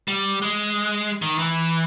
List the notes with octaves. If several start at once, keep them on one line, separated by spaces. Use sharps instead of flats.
G3
G#3
D#3
E3